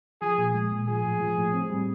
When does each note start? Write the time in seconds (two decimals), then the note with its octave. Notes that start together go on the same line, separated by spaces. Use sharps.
0.21 F3 G#4
0.38 A#2
0.54 G#3
0.72 A#2
0.88 F3 G#4
1.05 A2
1.21 F3
1.37 A2
1.54 C4
1.70 G3